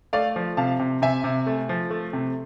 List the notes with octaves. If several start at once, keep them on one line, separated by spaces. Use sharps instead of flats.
A3 D5 F5
F3
C3 F5 A5
C3
C3 E5 G#5
C3
A3
F3
A3
C3